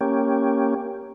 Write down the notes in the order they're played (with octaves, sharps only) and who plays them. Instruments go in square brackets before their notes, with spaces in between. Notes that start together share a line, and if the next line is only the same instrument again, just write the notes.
[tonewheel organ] A#3 C#4 G4